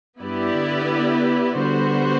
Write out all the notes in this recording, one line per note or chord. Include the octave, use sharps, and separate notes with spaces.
G2 B3 E4 G4 B4 D5
D3
D3 G3 B3 F#4 C5